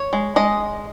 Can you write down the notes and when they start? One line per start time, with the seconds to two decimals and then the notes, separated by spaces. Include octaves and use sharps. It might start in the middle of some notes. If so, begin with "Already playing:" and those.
Already playing: C#5
0.13 G#3
0.36 G#3 D#5